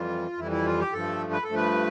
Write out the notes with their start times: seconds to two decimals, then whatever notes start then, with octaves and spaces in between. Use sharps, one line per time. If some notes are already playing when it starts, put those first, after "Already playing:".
Already playing: F2 E3 G3 F4
0.37 F2 E3 G3 E4
0.52 E4
0.66 F4
0.79 G4
0.93 G2 F3 A3 A4
1.32 B4
1.44 A4
1.49 G2 F3 A3
1.56 B4